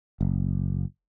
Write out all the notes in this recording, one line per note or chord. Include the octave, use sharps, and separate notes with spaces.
F#1